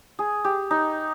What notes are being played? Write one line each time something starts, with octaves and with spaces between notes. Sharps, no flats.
G#4
G4
D#4